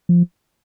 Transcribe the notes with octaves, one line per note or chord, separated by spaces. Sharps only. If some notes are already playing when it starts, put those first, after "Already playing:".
F3